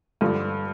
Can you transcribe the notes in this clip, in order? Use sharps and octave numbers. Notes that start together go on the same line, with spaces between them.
G2 D3 F3